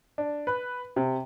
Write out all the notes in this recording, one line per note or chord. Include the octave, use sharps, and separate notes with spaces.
D4
B4
C3